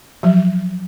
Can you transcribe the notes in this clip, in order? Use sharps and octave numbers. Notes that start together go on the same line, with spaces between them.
F3 F#3